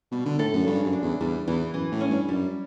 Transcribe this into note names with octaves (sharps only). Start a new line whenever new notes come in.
B2 G3
D3
A2 A4
F#2
G2 C#3
F#2
D4
E2
E2 G3
E2 E3
F#2 E3
A2
C#4
G2
F#2 G3